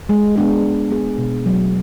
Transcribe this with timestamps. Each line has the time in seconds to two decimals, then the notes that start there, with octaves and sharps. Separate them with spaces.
0.09 G#3
0.36 B3 D4 G#4
0.63 G#3
0.91 B3 D4 G#4
1.18 B2
1.46 F#3 A3